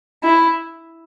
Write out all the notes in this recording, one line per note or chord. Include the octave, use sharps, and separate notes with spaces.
E4